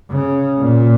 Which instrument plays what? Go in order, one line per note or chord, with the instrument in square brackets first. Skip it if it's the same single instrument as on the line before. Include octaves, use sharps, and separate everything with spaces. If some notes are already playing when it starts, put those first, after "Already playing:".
[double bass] C#3
A#2